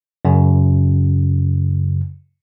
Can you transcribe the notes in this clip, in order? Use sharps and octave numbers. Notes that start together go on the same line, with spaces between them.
F#2 C#3